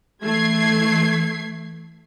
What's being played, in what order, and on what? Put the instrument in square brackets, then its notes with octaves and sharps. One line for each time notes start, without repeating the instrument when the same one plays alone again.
[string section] E3 A3 G#6 C7